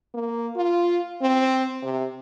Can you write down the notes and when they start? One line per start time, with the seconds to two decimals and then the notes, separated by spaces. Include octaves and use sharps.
0.14 A#3
0.56 F4
1.22 C4
1.83 C3